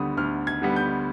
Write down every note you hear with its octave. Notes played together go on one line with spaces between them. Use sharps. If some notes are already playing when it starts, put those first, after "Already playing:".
Already playing: D2 D3 G3 B3 D#6
D2 F6
G#6
D3 G3 B3
G6